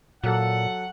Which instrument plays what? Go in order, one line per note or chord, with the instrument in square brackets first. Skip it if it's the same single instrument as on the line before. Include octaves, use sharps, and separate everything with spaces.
[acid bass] A#2 [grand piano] F#3 A4 [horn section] F#5